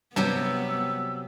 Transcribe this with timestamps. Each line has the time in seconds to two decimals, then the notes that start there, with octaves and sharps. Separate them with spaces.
0.16 G2 C3 F#3 B3 G4 E6